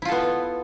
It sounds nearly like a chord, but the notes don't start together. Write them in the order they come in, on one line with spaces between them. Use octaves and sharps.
E4 F4 A4 B3